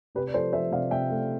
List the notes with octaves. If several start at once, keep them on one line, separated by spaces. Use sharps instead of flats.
C3 G4 B4
D5
F3 A4 C5
F3 C5 E5
C3 D5 F5
C3 E5 G5
A3